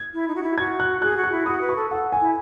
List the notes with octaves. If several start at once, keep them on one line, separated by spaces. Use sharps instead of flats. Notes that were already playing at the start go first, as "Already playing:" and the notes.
Already playing: G#6
E4
D#4
F#4
E4
F#4 G#6
F#6
G#4 F#6
F#4
F#6
E4
F#4 D#6
B4
C#6
A4
A4 F#5
G#5
E4